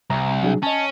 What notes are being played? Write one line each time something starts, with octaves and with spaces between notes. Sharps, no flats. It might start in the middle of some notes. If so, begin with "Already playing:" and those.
C2 A#5
F#3 D4 G#4
C#4 D#5 A5